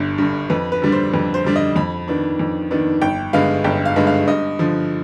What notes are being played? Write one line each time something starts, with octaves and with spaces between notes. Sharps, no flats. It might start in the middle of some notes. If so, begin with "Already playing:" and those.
Already playing: G1 G2 D3
G2 D3
F2 B4
B4
D3 G3 D4
C5
F2 B4
C5
D3 G3 D4
D#5
F2 B5
D#3 B3 D4
F2
D#3 B3 D4
G1 G5
G2 D3 G#3 B3 F5
G1 G5
F5
G2 D3 G#3 B3
F5
G2 D#5
D3 F3